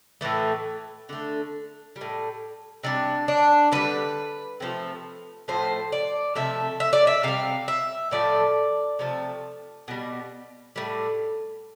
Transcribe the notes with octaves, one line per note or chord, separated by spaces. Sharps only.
A2 E3 A3
D3 A3
G3
A2
C3 G3 D4
D4
D3 G3 B4
C3 F3 A3
A2 F3 A3 C5
D5
C3 F3 A3 E5
E5
D5
E5
C3 G3 F5
E5
A2 F3 A3 D5
C3 F3 A3
B2 G3
A2 G3